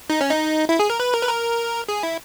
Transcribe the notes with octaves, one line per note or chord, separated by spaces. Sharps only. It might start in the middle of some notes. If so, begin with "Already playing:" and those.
D#4
C#4
D#4
E4
G#4
A#4
B4
A#4
B4
A#4
G#4
E4